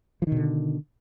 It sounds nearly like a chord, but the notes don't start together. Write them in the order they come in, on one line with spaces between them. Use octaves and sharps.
F3 D#3 B2 D3